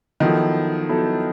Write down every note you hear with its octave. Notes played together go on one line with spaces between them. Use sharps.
D#3 F3 F#3 B3 E4 A4
F#3 B3 E4 A4